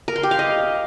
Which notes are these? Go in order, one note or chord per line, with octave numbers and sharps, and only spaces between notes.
A#4
C6
G4
F5
D#5